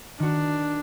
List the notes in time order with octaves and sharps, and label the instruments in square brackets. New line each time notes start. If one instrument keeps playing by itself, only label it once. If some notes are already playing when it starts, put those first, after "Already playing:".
[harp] D#3 F#4 [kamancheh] D4